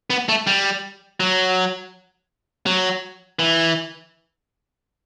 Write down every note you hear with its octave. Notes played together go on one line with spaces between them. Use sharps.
B3
A3
G3
F#3
F#3
E3